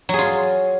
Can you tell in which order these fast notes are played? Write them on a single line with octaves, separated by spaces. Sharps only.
F#3 G#4 F4